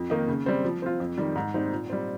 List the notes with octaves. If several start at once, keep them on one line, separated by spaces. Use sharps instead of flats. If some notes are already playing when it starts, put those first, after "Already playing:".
Already playing: F2
D#3 A#3 D#4
C#3
G3 C4
F3
C4 F4
F2
D#3 G3
G#2
G3 C4 D#4
A#2
G3 C4